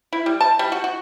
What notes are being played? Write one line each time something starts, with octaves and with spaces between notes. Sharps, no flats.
E4
G3
A5
G3
F#4
F#4